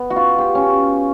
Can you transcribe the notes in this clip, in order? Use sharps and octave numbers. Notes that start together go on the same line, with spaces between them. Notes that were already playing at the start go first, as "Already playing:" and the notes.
Already playing: B3
F#4
F4
G4
C#4